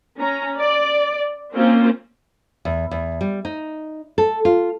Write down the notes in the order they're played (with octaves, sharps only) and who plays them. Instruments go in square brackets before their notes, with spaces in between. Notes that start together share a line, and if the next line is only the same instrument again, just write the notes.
[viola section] C#4 A#5
D5
A#3 C4 C#4 F4 C5
[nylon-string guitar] E2
E2
G3
D#4
A4
F4